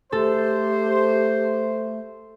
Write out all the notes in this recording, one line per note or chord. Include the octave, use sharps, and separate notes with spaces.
A3 G4 A4 C5